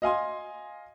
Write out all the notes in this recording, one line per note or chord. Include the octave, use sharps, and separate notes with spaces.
D#5 F5 G#5 C6